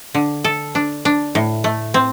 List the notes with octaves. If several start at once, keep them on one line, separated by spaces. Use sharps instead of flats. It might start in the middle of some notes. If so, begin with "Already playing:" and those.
D3
A4
D4
D4
A2
A3
C4